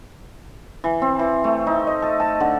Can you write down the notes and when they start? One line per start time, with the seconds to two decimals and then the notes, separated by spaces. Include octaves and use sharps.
0.84 E3
1.02 C4
1.19 E3
1.44 A3
1.67 D#4
1.87 D#5
2.02 A4
2.20 A5
2.40 D3